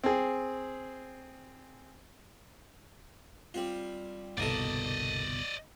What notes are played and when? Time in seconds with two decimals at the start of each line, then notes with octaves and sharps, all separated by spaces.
0.04 C4 G#4
3.54 G3 C4 F4
4.38 G1 C2 B2 A#3 A4 D5 D#5